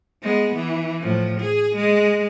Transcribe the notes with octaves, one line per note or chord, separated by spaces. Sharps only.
G#3 B3
E3
A2 F3
G#4
G#3